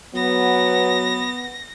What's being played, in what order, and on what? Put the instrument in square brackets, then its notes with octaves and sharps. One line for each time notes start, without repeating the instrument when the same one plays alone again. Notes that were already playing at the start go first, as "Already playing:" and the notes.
[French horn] F#3 [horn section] B3 [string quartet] A#6